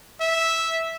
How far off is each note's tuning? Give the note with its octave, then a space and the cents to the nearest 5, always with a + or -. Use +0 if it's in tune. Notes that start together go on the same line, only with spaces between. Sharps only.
E5 -10